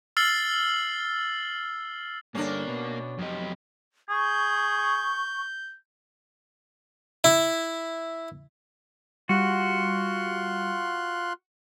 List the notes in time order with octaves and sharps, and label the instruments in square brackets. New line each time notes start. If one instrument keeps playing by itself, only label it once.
[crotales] E6 F6 A6 C7 F#7 G7
[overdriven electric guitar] G2 D3 [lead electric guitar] A#3 [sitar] C#4 D4
[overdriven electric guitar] B2
[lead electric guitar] F2 G4 [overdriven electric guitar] F#3 D#5
[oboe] G#4 [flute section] C#6 [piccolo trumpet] G6
[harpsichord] E4
[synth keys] G3 [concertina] F4 C6 F#6 [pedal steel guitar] F#4